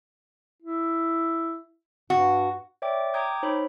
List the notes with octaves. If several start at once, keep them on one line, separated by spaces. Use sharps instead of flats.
E4
G2 F#4
C#5 D5 E5 G5 D6
G5 A#5 D6 D#6 G6 G#6
D#4 C5 C#5 B5